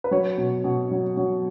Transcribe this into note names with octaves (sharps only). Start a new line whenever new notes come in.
B4
F#3 C#5
B2
B2
F#3
F#3